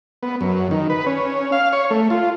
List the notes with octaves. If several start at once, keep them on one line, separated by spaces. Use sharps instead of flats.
B3
F#2
D#3
B4
C#4
F5
C#5
A3
F4